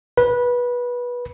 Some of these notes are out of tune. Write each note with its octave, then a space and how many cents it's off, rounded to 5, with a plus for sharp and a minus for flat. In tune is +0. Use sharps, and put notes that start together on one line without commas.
B4 -20